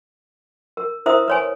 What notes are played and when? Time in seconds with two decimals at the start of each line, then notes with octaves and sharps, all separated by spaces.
0.77 A#4
1.06 E4 A#4 C5 E5 D#6
1.28 B4 C#5 G#5